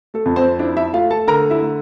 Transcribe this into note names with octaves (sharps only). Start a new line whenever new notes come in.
A3 A4
F2
C4 C5
D4 E4 D5
E4 E5
A3 F4 F5
A4 A5
D3 A#4 A#5
E4 E5
A3